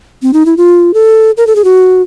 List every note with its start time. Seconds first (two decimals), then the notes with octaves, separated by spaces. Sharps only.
0.22 C4
0.33 D#4
0.46 E4
0.57 F4
0.94 A4
1.37 A#4
1.47 A4
1.56 G#4
1.64 F#4